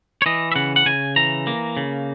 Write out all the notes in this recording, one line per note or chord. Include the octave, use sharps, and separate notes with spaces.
C#5
E3 D#5
E5
C#3 F#5
F#5
C#3 G#5
E3 A#5
A#3
C#3